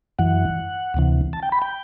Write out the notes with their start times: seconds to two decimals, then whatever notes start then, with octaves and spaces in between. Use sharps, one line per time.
0.19 F#2 E3 F#5
0.94 D2 C3 E3
1.33 A5
1.43 G5
1.52 B5
1.62 G5